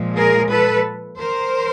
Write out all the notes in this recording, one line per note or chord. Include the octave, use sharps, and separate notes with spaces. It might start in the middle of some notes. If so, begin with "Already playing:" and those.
Already playing: A#2 F3 G#3
G#4 A#4
A4 B4
A#4 C5